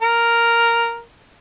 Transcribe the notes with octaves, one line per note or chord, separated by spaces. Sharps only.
A#4